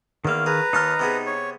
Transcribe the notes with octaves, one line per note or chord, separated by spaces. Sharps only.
E2 D#3 A#3 F5
G#4 B4 A#5
D#2 D#4 A5 C6 F6
C3 B3 G#4
C#5